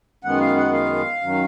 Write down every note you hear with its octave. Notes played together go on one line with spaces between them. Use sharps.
F#2 D#3 G#3 B3 F#5
F5
F#5
F5
F#2 D#3 F#3